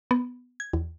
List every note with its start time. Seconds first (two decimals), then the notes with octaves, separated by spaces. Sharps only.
0.11 B3
0.60 G#6
0.73 E2